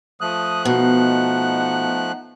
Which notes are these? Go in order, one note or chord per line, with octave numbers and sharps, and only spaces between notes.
F3 A3 D#6 F#6
B2 D#4 F#5